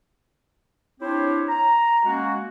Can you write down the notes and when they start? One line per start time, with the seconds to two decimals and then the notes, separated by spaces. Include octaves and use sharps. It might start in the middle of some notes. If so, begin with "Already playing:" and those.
1.00 C4 D4 E4 G4 C5 C#5
1.48 A#5
2.05 G#3 A#3 C#4 F#4